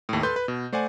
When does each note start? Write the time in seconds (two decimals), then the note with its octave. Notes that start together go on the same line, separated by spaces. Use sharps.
0.09 D#2 A2
0.23 A4 B4 C6 G6
0.36 B4
0.48 B2
0.73 A3 C5 D5 F#5 G#5